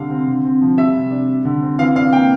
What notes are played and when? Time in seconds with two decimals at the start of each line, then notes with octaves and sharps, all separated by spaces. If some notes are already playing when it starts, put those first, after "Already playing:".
Already playing: D3 G3 F5
0.10 C4
0.27 D3
0.44 C4
0.62 F3
0.77 G3 E5
0.94 C3
1.11 D4
1.28 G3
1.45 D3
1.62 C4
1.79 E3 F5
1.95 D4 F5
2.13 A#3 G5